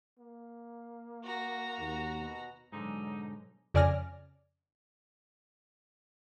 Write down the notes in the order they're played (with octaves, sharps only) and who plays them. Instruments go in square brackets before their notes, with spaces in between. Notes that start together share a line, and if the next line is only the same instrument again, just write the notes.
[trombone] A#3
[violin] F#4 A#5
[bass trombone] D#2
[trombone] B2
[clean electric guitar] G#2 D3 [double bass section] B2 F#3 G#3 [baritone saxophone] D#4
[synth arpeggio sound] F2 C#3 D5 G#5 F6 A#6